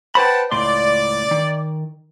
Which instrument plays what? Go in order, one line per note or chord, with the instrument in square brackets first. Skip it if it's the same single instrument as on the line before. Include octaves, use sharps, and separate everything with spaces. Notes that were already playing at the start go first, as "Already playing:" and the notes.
[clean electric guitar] B4 C5 B5 [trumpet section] F#5 G5 A5
[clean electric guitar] C#2 A2 C6 [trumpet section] D5
[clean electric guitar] D#3